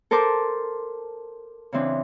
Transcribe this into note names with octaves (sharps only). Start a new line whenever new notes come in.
A4 A#4 C5 A5 D6
C#3 E3 C4 D4